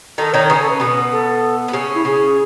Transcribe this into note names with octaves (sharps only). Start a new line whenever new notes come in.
D#3 D#4 A4
D#3 D#4 C#5
C#3 C#4 B4
A4
B4
B2 B3
A4
B3
C#3 C#4
E4
C#3 C#4 G#4